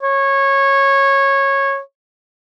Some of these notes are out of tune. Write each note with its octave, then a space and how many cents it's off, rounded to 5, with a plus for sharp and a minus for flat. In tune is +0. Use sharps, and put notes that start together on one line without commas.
C#5 -15